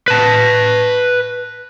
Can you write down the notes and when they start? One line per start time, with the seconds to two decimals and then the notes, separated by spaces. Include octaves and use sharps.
0.08 B4 A5